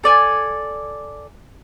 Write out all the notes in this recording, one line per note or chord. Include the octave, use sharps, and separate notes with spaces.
A4 D5 G#5